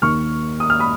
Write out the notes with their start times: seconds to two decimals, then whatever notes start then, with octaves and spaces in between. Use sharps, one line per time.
0.02 D#2 D#3 A#3 C#6 F6
0.60 D#6
0.70 F6
0.79 B5 D#6